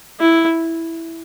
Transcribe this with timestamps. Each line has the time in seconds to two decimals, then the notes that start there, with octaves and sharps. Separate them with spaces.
0.20 E4